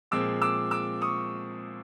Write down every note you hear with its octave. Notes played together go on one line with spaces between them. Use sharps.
A#2 F3 G#3 C4 D6 E6
D6 E6
D6 E6
C#6 D#6